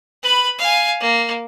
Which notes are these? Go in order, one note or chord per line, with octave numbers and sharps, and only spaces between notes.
B4 B5
F5 G#5
A#3